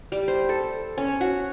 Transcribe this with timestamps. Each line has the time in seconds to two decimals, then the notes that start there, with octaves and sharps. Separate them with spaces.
0.12 G3
0.28 C5
0.49 A4
0.97 C#4
1.21 F#4